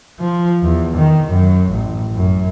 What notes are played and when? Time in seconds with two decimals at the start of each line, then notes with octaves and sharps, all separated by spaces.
0.20 F3
0.63 E2
0.97 D#3
1.28 F#2
1.71 A1
2.15 F#2